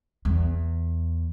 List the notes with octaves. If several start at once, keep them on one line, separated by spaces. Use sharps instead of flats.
E2